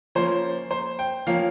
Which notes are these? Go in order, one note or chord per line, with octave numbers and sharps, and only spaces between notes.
F3 A#3 C#4 C5
C5
G5
F3 A#3 C#4 F5